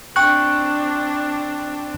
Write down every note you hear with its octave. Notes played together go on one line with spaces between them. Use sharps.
C4 D4 G5 C#6 F#6